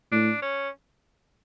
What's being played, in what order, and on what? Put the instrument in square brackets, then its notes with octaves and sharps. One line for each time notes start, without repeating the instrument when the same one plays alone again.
[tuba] A2 [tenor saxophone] D4
[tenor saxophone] C#4